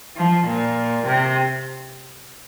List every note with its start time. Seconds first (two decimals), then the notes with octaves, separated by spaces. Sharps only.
0.16 F3
0.47 A#2
1.07 C3